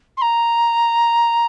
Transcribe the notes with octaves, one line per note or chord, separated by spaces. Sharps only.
C6
A#5